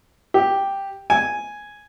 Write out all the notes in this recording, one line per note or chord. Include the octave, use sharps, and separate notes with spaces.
G4
G#5